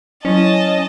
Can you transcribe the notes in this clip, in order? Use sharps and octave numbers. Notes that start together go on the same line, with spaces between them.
F#3 C#4 E4 D#5 A5